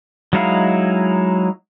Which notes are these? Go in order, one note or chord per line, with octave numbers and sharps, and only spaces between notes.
F#3 G#3 D#4 E4 F5